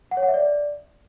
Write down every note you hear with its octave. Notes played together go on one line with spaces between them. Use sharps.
F#5
C#5
F#5
E5
D5